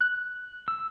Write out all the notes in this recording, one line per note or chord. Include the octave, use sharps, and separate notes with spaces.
F#6
E6